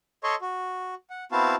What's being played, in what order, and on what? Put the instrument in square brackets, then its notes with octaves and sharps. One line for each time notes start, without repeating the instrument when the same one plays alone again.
[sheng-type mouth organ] A4 C#5 D#5 C6 C#6
F#4
F#5
B3 C4 E4 F#4 F5 A5